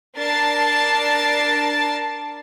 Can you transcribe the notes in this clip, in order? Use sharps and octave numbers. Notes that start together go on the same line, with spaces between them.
D4 A#4 A5 A6 C7